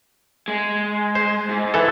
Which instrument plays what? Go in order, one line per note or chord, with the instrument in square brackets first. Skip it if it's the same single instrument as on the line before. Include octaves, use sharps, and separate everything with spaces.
[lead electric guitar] G#3
[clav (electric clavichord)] C5
[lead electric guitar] G#2
[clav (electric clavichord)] E3 A4